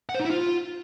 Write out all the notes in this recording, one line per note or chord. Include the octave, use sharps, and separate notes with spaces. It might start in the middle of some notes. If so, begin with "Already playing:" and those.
F#5
C5
D#4
E4
F4